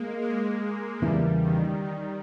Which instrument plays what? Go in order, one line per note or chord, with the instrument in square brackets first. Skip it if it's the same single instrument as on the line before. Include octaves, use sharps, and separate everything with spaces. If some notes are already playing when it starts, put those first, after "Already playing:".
Already playing: [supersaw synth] G#3 A#3
G#3
[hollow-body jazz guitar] E2 C#3 E3 A#3 E4 [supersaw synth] G3
[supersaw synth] D#3
D#3